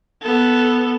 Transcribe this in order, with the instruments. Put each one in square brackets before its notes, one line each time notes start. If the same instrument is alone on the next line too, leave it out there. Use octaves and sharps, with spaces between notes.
[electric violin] B3 A4